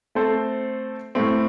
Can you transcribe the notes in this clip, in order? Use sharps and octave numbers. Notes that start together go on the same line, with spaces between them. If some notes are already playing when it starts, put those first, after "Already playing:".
A3 C4 A4 C5
A2 A3 C4